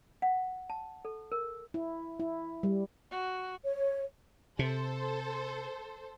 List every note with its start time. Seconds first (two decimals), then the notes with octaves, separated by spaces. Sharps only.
0.22 F#5
0.70 A5
1.05 A4
1.32 A#4
1.74 E4
2.20 E4
2.63 G3
3.11 F#4
3.64 C#5
4.59 C3 A4 C5